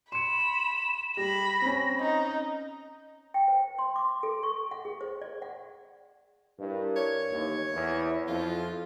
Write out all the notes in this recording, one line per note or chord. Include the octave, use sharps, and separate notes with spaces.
B5 C6 C#7 E7
G3 B5 A#6
C4 C#4
D#4
G5
C5
C6
D6
A4
C#6
F#5
G#4
C5
D5
F#5
G2 E4 A#4 D5
C#5
D#2 A2 D#3 E3
E2 E4
F2 F4